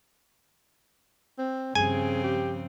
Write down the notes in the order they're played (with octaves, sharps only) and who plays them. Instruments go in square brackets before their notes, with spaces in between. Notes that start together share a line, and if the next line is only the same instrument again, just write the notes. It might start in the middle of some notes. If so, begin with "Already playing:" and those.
[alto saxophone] C4
[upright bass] G2 F3 [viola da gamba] C#3 C4 [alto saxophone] G#4 [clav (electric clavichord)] G#5
[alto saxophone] G4